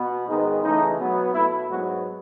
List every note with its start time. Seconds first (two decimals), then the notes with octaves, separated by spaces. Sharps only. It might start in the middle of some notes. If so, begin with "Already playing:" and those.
Already playing: B2 B3
0.27 G#2 D#3 G#3 B3 D#4
0.62 C#3 E3 A3 D#4
0.98 B2 F#3 B3
1.33 B2 A3 E4
1.69 G#2 F#3 B3 F#4